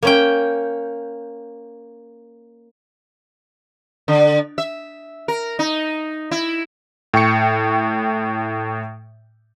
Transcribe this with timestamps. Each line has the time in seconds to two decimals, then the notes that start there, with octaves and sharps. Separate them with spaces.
0.03 A#3 C#4 G5
4.08 D3
4.58 E5
5.28 A#4
5.59 D#4
6.31 E4
7.14 A2 G5 C#6 C#7